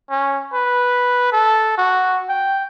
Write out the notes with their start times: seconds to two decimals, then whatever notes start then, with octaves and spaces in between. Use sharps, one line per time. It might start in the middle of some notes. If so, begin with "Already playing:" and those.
0.10 C#4
0.54 B4
1.32 A4
1.78 F#4
2.29 G5